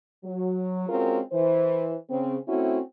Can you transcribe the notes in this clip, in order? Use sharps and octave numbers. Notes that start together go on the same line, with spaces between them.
F#3
G#3 C4 C#4 F4 F#4 A#4
E3 C5
C#3 C4
A3 C4 C#4 E4 F#4